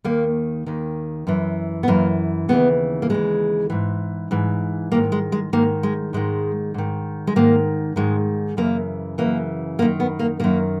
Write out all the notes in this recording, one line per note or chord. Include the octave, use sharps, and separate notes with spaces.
D#2 D#3 A#3
D#2 D#3
F#2 E3
B3
F#2 E3 A#3
D#2 C#3 E3 B3
A#3
D#2 C#3 E3 G#3
G#2 E3
G#2 E3
G#2 D#3 A#3
G#3
G#3
G#2 D#3 A#3
G#3
G#2 D#3 G#3
G#2 D#3
G#3
G#2 D#3 A#3
G#2 D#3 G#3
F#2 C#3 E3 A#3
F#2 C#3 E3 A#3
F#2 D#3 A#3
B3
A#3
F#2 D#3 A#3